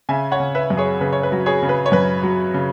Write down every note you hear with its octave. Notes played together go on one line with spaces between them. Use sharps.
C#3 E5 G#5
C#5 F#5
C#3
B4 E5
F#2
G#4 C#5
C#3 B4
C#5
B4
F#3
G#4 C#5
C#3
B4
C#5
F#2 B4
F#3
C#3